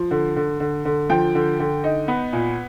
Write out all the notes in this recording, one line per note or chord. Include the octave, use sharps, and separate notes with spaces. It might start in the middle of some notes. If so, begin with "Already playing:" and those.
Already playing: F3
D3
D3
D3
D3
F3 G5
D3
D3
D#4
B3
A#2